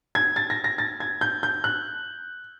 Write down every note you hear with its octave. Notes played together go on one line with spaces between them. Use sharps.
G#6
A6
A#6
A#6
A6
G#6
G6
G6
F#6